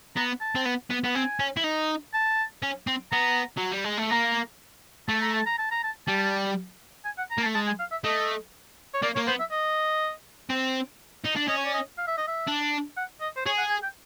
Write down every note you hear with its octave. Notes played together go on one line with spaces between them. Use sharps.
B3 A#5
A5
C4
B3
B3
B3
C4 G#5
C#4
E4
D#4
A5
C#4
C4
B3 A#5
F#3
G3
G#3
A3
A#3 A#5
A3 A5
A#5
A5
A#5
A5
A#5
A5
G3 A5
G#5
F#5
A#5
A#3
A5
A3
G#3 A5
G#5
F5
E5
A3 D#5
C#5
A#3 D5
A#3 C#5
B3 C5
E5
D#5
C4
D#4
D4
C#4 D#5
C#5
D5
D#5
F5
E5
D#5
E5
D4
F#5
D#5
C5
G#4 C#5
F#5
G#5
G5